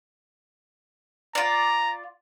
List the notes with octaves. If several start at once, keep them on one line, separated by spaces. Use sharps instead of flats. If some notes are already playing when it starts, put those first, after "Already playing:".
F4 D5 A#5